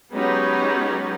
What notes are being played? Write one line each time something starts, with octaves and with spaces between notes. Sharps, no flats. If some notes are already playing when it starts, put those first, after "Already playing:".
F#3 G#3 B3 C#4 D#4 G4